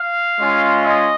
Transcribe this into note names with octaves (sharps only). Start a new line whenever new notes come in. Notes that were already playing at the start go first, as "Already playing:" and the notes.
Already playing: F5
G#3 C#4 F4
D#5